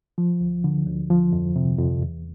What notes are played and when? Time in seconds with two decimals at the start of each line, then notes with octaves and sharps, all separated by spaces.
0.18 F3
0.41 D2
0.64 D3
0.87 D2
1.10 F3
1.32 F2
1.56 C3
1.79 F2
2.02 E2